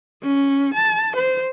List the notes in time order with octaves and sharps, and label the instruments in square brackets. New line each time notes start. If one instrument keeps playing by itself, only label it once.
[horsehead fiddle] C#4
A5
C5